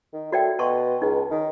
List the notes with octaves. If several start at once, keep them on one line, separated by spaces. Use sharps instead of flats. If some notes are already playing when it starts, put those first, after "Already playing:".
D#3
A3 F#4 D5 G5
B2 A5 C6 C#6
C#2 D#4
D#3